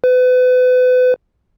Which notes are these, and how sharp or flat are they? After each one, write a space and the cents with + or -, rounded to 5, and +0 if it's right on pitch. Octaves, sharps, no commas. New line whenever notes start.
B4 +35